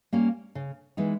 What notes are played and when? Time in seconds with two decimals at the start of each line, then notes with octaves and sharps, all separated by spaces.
0.13 G3 A#3 C#4
0.55 C#3
0.97 E3 G#3 B3 D#4